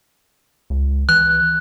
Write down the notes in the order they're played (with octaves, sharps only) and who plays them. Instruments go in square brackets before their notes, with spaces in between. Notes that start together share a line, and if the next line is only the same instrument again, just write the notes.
[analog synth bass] C#2
[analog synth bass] E3 [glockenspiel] F#6